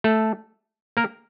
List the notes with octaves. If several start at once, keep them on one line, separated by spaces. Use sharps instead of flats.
A3 A4
A#3 A#4